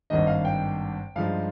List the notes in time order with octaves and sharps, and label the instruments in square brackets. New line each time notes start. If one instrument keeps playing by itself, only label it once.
[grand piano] G#1 G2 D#3 D#5
F5
G5
G2 F3 G#3 D#4 F5